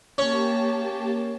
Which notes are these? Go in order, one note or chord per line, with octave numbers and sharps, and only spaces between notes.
A#3 C#4 G4 A5